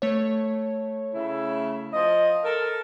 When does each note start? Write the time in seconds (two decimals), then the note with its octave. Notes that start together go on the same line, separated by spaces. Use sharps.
0.02 A3 C#5
1.14 C#3 E4
1.93 F3 D#5
2.44 A4 A#4